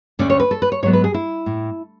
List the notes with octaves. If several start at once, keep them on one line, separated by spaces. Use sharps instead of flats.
D2 D3 A3 C#4 D5
C#5
B4
A4
B4
C#5
G#2 F#3 B3 C#5
B4
G#4
E4
A2